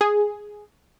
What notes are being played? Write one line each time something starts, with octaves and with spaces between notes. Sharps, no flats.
G#4